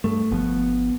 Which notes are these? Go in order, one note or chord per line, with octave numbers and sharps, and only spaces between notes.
G2 A3
G1 F3 B3